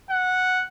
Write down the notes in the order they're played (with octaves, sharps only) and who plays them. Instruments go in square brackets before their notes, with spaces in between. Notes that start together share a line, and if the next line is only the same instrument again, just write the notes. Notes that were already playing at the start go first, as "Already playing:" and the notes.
[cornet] F#5